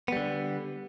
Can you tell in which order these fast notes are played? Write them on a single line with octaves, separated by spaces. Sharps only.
B3 G3 D3